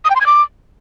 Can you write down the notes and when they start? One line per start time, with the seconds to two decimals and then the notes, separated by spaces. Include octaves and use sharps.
0.05 D#6
0.10 G5
0.15 C6
0.21 G#6
0.26 D6